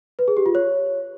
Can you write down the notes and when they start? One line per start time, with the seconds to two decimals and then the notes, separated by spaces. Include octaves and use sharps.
0.19 B4
0.28 G#4
0.37 G4
0.46 F4
0.55 C#5